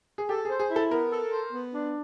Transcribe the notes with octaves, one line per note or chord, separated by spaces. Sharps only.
G#4
G4 A4
G#4
C5
G#4
E4
A4
B3 A#4
A4
C5
B3
D4